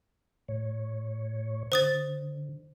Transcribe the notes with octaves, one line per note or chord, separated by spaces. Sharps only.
A2 C#5
D3 C5 D#6 A6